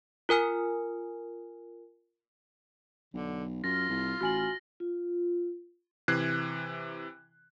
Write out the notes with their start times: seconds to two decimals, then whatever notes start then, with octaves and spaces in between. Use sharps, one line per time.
0.29 F4 A#4 G#5 F6
3.14 B1 D3
3.64 F#2 F4 F6 A6 A#6
3.90 C2
4.21 A1 F#4 G#5 F6 F#7
4.80 F4
6.08 C3 E3 F#6 G#6 C7